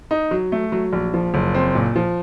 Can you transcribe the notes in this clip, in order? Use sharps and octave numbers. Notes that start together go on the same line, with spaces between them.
D#4
F#3
A3
F#3
A#1
F3
F#1
C4
A#2
F3